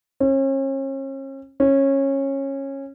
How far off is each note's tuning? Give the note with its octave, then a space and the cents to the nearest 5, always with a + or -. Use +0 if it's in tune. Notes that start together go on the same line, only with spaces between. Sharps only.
C#4 -40
C#4 -20